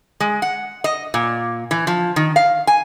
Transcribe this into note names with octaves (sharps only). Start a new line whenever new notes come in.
G#3
F#5
D#5
A#2
E3
F3
D#3
F5
G#5